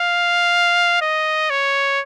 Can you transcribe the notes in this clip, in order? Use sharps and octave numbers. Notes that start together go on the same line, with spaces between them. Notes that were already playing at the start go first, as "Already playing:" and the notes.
Already playing: F5
D#5
C#5